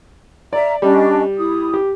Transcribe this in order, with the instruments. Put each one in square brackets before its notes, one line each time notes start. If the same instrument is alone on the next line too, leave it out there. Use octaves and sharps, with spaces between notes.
[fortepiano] D5 [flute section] E5 A#5
[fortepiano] G3 [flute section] C#4 D4 D#5
[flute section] E4 D#6
[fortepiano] G4